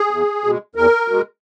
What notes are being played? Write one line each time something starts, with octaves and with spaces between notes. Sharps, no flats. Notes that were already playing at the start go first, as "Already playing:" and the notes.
Already playing: G#4
E2
B2 G#3
E2 A#4
B2 G#3